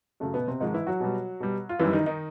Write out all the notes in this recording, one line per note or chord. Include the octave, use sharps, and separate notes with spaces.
F#2 C#3 F#3 A3
B2 B3
C3 C4
G#2 D#3 F3 G#3 D#4
E3 E4
F#3 F#4
B2 G3
B2 G3
F4
F#2 D#3 E3 G3 E4
D#3 D#4
D#3 D#4